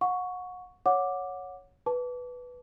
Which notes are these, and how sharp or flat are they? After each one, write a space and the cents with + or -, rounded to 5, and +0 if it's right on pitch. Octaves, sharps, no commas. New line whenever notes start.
F#5 -30 C#6 +10
C#5 +0 F#5 -20 D6 +0
B4 +0 A5 +0 D6 -35